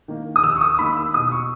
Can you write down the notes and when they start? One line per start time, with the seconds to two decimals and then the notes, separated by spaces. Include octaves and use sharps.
0.08 D#3 A#3
0.36 D#6
0.43 D#2 E6
0.56 C#6
0.61 D#6
0.79 D#3 A#3 B5
0.97 E6
1.14 B2 D#6
1.32 C#6